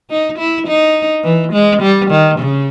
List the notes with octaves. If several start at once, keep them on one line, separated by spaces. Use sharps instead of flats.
D#4
E4
D#4
E3
G#3
G3
D#3
C#3